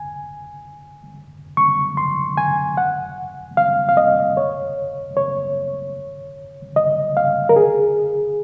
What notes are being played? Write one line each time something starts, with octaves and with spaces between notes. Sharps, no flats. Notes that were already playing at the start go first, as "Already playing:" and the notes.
Already playing: G#5
C#6
C6
G#5
F#5
F5
F5
D#5
C#5
C#5
D#5
F5
A#4
G#4